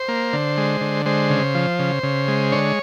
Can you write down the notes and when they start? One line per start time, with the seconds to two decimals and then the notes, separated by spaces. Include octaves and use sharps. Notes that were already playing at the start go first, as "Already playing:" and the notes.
Already playing: C5
0.08 A#3
0.33 D3
0.57 G#3
0.81 D3
1.06 G#3 C5
1.30 C#3
1.55 F3
1.79 C#3
2.03 C#3
2.28 G#3
2.52 D3 C#5